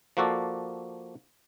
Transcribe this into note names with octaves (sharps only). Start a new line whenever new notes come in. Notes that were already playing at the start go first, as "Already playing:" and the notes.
F3 A#3 F#4 A4 D5